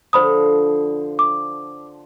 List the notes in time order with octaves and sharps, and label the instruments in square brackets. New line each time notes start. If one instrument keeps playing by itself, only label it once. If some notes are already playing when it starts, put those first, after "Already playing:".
[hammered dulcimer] D3 F3 [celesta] C5 B5 D#6
[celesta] D6